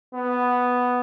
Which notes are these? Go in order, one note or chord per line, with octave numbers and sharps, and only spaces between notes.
B3